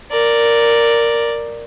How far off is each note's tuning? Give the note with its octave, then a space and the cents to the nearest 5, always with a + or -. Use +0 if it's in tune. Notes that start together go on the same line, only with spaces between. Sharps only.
A#4 +0 D5 +0